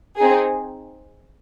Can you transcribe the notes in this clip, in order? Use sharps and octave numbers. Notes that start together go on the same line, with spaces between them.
C4 D#4 G#4